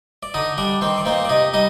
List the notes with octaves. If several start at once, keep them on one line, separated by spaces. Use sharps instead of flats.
D5
D3 D#4 D#5
G3 D4 D5
D#3 C4 C5
D5
A#3 C4 D#4 C5
D5
C3 D#4 D#5
G3 D#4 D#5